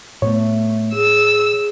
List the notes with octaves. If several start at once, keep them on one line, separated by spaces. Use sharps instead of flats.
A2 A3 B3 C#5
G#4 E6